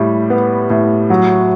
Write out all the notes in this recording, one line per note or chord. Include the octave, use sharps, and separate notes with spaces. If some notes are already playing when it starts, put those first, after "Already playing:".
Already playing: A2 G3
B3
A2
F#3